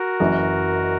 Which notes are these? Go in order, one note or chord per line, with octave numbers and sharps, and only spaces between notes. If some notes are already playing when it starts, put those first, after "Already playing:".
Already playing: F#4 A#4
F#1 F#2 E3